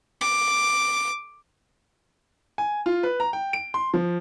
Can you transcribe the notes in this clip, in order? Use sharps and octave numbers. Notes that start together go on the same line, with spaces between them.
D6
G#5
F4
B4
A#5
G5
D7
C6
F3